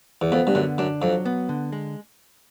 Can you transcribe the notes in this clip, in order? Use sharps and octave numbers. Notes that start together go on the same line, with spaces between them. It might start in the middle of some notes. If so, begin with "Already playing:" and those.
E2
F2 B3
G2
F#2 D3
F#2 D4
F2 F#3
B3
D3
G#3